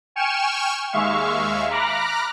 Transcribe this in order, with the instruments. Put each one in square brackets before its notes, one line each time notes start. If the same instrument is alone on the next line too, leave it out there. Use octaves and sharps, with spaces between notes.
[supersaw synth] G5 G#5 C#6 F6 C#7 E7
D#2 G#3 E5 F5 C#6
A#5 B5 D6 F6 F#6 A#6